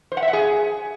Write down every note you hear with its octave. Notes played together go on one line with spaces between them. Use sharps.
C5
F#5
E5
F#5
G#4